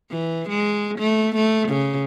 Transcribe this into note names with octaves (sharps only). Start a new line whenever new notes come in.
E3
G#3
A3
A3
C#3